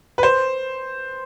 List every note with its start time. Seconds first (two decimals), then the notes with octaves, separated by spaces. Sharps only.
0.18 B4
0.23 C5